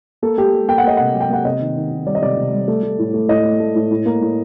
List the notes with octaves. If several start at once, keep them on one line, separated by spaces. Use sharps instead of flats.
A#3 A4
A#3 G4
A#3
A#3 G5
F#5
A#3 D#5
C3 F#5
F#3
G5
A#3 F#5
C3 D#5
D#3
D#3
D#3
G3 D5
D#5
C3 D5
C3
G3
A3
A3
A2
A3
A2 D#5
A3
A3
A2
A2
A#3
A2